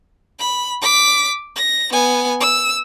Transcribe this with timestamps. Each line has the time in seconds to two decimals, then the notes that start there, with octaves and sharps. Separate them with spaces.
0.39 B5
0.82 D6 B6
1.56 A#6
1.92 B3 G#5
2.40 E6